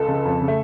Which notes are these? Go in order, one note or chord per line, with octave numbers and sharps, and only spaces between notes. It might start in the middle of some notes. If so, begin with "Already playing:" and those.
Already playing: C#2 A4
C#3
F2
C#3
A3